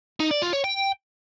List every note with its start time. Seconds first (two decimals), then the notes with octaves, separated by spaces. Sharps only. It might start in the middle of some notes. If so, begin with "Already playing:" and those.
0.20 D#4
0.31 D5
0.42 F4
0.53 C#5
0.64 G5